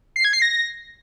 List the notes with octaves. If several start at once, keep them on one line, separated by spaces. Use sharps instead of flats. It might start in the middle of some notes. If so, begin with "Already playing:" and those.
C7
G#6
C7
A#6